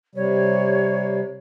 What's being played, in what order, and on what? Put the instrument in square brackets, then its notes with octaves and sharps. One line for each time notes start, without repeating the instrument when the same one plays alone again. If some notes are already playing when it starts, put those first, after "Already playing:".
[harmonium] C3 G3 [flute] C#5